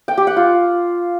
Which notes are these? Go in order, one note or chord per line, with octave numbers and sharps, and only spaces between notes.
G5
G4
F#5
F4